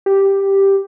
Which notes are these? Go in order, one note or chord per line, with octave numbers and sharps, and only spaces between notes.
G4